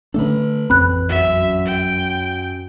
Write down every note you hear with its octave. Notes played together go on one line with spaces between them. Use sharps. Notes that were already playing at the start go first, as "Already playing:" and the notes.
D3 A3 D4 A4 B4
A1 F2 C4 B5 F#6
F#2 F#3 E5
G5